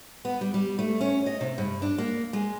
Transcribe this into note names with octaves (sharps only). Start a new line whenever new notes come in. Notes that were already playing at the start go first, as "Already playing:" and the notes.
B3
G3
G3
A3
C#4
D#5
C3
G2
D4
A#3
G#3